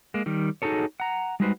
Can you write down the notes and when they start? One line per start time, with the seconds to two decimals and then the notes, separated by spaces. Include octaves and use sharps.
0.14 G#3 A#3
0.26 D#3 G3
0.62 D#4 F#4 G#4 A4 C#5
1.00 F#5 A#5
1.40 G3 G#3 D#4 F#4 B4 C5